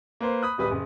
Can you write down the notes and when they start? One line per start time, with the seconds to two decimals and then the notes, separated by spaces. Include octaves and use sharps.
0.21 A#3 B4 C5
0.43 B5 D#6 F#6
0.58 D1 G3 B4 B5 D#6
0.71 F#1